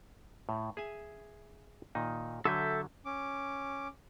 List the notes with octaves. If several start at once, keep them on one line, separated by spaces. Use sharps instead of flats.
A2
G#4 E5 G#5
A#2 D#3 D#4
D3 F#3 A4 E5 G#5 G6
C#4 D6